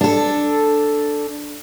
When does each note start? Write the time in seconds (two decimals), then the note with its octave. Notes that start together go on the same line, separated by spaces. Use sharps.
0.01 D4 A4